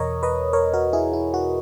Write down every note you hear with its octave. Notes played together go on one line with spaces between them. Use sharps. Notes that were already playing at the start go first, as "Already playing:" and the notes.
Already playing: E2 B2 A#4 C#5 D#5
B4 D#5
A#4 C#5
F#4 A#4
E4 G#4
E4
F#4